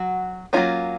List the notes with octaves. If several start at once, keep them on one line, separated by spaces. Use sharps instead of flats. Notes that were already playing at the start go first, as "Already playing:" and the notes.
Already playing: F#3 F#4
F3 F#3 A#3 C#4 F4